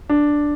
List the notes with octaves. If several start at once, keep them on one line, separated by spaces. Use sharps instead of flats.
D4